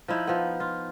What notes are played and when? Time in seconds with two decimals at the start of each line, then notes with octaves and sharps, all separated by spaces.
0.08 F3 D#4 E4
0.27 F3 B3
0.60 F4